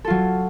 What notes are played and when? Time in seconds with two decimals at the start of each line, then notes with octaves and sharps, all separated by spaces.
0.05 A4
0.07 F4
0.10 F#3